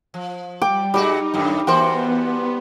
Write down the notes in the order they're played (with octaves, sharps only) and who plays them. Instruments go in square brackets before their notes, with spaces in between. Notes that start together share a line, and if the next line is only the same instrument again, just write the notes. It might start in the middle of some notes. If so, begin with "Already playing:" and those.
[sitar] F3
[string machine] G3 [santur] G5 D6
[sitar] A#2 G#3 F#4 [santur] G3 D6 [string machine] D#4
[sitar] F#2 A2 D#3
[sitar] E3 F#4 A#4 [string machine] B3 [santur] C5 G5